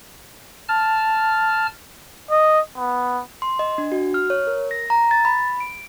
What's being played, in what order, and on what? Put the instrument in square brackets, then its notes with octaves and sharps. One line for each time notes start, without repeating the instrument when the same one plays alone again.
[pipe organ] A5 F6
[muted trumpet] D#5
B3
[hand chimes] C6
D#5
D4
F#4
F6
C#5
A#4
A#6
A#5
A6
B5
D7